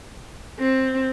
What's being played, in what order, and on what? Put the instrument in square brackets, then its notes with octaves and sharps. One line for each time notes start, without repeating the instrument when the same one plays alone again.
[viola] C4